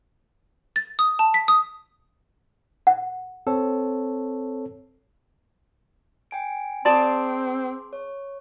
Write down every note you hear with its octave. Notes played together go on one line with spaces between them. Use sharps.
A6
D#6
A5
B6
D#6
F#5
C4 A4 C#5
G5 G#5 D7
C4 G#4 D5 A5 C6 D6
C#5